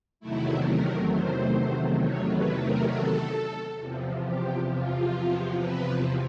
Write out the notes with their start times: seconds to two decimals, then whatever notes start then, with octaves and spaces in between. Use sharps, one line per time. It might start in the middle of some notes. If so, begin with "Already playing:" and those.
0.20 E2 C3 D#3 F#3 A3 E4
0.65 A#4
1.10 C5
1.99 C#5
2.30 B4
2.59 A#4
2.90 A4
3.78 E2 C3 F3
4.23 G4
4.68 F4
5.58 B4